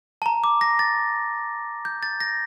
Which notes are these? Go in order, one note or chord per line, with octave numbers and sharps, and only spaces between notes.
A5
A#5
D6
A#6
A6
G6
A6
A#6